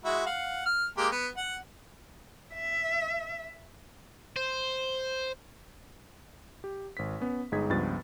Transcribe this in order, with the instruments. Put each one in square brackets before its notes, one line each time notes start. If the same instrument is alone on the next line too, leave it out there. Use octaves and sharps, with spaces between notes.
[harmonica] G#3 E4 F#4
F5 F#5
F6
G#3 A#3 G4
B3
F#5
[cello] E5
[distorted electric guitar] C5
[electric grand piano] G4
G#1 B6
B3 C#4
G1 G#3 D#4 G#4 G#6 B6
C#2 G2 F3 B3 A6